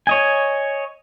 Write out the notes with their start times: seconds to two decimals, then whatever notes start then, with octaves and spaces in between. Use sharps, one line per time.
0.07 C#5 D#5 G#5